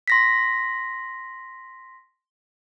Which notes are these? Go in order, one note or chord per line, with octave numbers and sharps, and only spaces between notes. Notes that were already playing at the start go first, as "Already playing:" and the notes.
C6 A#6 B6